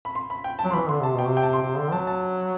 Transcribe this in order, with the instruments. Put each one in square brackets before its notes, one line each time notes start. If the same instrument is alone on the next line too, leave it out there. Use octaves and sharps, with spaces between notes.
[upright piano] B5
C6
B5
G5
A5
[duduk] F#3
[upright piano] C6
[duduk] E3 [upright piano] B5
[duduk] D3 [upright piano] C6
[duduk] C3 [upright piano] A5
[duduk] B2 [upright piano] G5
[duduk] C3
[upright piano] G5
A5
C6
[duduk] C3
D3
[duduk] F#3 [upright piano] A5
[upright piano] A5